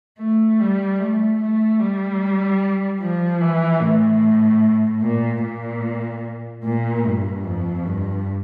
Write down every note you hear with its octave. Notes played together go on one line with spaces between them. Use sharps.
A3
G3
A3
A3
G3
F3
E3
A2
A#2
A#2
A#2
G2
F2
G2